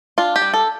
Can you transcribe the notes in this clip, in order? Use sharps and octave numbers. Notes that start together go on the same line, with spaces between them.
D4 F4
G4
G3
A4